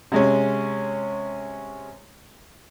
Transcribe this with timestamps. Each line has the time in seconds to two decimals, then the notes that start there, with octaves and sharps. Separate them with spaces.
0.12 C3 G#3 C#4